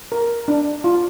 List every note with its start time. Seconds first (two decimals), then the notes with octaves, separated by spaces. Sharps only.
0.12 A#4
0.48 D4
0.84 F4